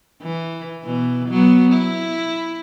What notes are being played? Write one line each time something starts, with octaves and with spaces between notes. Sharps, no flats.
E3
B2 E3
F#3 B3
E4